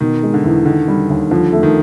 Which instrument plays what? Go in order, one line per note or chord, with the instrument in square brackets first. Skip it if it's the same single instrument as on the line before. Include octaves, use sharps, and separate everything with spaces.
[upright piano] B2 [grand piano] D#3
[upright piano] G#3
[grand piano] D3
[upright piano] E2
[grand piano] D3 [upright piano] D#3
[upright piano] G3
D#2
[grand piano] D3 [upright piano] F3
[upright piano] A3
[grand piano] D#3